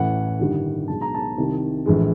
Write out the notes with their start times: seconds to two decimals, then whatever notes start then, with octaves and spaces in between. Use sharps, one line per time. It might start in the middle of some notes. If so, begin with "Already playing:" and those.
Already playing: A1 A2 E3 F#5
0.39 G1 G2 D#3 G3
0.88 B1 B2 G#3 A5
1.01 A#5
1.14 A5
1.38 C2 C3 D#3
1.86 A#1 A2 E3 G#3